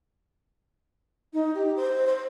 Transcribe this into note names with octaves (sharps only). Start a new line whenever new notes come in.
D#4
G4
C5
C5